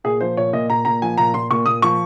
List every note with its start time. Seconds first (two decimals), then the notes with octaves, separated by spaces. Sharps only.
0.04 A#2 G#4
0.21 F3 C5
0.37 A#2 C#5
0.53 A#2 D#5
0.69 A#2 A#5
0.85 A#2 A#5
1.02 F3 G#5
1.18 A#2 A#5
1.34 A#2 C6
1.50 A#2 C#6
1.66 A#2 D#6
1.82 F3 C#6